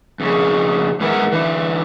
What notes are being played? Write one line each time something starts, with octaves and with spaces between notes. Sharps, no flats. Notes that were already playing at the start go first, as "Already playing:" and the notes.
F2 C#3
G#2 E3 B3 E4 A#4 F#5
D3 E3